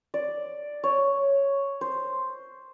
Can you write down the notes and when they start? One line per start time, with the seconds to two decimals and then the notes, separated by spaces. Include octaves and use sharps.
0.14 D5
0.84 C#5
1.81 C5